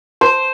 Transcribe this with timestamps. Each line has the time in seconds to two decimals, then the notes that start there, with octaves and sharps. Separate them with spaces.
0.21 C5